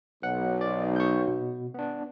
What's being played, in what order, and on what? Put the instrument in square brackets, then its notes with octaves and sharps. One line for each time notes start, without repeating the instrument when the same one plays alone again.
[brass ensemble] B1 [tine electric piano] F#5
[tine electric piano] D5
C#6 G6
B2
B3 D4